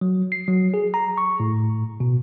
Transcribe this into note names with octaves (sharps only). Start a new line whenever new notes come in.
F#3
C7
F#3
G#4
A#5
C#6
A2
B2